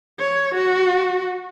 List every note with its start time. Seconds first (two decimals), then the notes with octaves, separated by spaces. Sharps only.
0.19 C#5
0.54 F#4